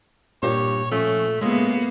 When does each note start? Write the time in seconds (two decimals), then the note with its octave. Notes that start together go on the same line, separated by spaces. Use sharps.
0.43 G2 A#2 C4 G4 C#5
0.91 F3 A3 C#4
1.41 C#3 G#3 A#3 B3 F4 E5